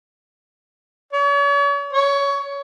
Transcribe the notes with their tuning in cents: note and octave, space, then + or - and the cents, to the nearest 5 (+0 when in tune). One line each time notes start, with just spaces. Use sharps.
C#5 +40
C#5 +20